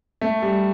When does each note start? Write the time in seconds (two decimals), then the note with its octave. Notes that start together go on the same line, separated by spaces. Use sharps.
0.21 A3
0.42 G3